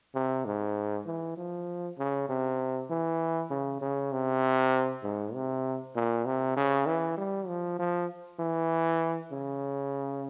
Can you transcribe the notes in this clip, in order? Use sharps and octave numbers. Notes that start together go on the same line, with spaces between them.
C3
G#2
E3
F3
C#3
C3
E3
C#3
C#3
C3
G#2
C3
A#2
C3
C#3
E3
G3
F3
F3
E3
C#3